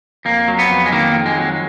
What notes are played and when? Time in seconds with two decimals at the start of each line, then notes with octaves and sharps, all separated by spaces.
0.25 F2 A#3
0.48 F#3
0.59 B3
0.70 F2
0.86 G#3
0.92 D#3 A#3
1.14 F2
1.26 G#3
1.37 F#3